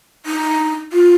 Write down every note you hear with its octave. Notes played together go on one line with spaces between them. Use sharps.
D#4
F4